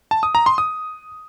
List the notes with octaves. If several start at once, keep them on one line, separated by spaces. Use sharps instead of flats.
A5
D#6
A#5
C6
D#6